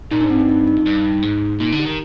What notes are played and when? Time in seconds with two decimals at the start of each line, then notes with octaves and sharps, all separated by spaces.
0.11 A#2 D#4
0.21 G#2 D4
0.30 C4
0.37 G2 D4
0.49 D#4
0.67 D#4
0.77 F2
0.86 G2
1.23 G#2
1.60 A#2 D#4
1.72 D3
1.79 G4
1.85 D#3